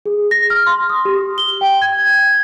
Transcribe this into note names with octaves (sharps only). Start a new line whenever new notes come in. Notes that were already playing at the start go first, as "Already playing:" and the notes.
G#4
A#6
F6
C6
D#6
G4
G7
G5
G#6